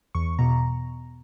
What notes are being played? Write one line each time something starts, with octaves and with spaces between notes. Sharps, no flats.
E2 C#6
B2 A#5